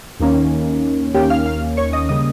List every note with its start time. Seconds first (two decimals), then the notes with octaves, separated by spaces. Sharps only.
0.20 D#2 D#3 A#3 C#4
1.14 D#2 D#3 A#3 C#4 G4 G5
1.30 F5 F6
1.46 F5 F6
1.77 C#5 C#6
1.93 D#5 D#6
2.09 C#3 G3 A#3 D#5 D#6